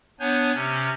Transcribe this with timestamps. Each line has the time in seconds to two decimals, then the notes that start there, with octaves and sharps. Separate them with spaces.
0.19 B3 D4 C#5 G#5 G6
0.55 C3 C#4